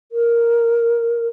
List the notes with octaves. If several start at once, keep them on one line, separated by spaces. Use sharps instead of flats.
A#4